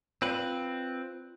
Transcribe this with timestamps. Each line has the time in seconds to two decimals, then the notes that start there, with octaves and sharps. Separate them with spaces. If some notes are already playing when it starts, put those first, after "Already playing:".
0.22 C4 F4 B4 D5